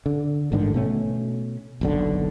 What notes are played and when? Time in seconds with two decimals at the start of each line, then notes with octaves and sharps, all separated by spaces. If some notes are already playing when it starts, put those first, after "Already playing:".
0.06 D3
0.52 A1 G#2 D3 D#3
0.74 B2 A3 C#4
1.81 F#1 B1 D3